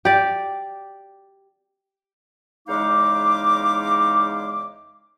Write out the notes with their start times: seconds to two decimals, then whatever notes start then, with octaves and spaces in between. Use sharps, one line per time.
0.05 G4 D5
2.68 E2 C#3 G#3 D#4 F5 D6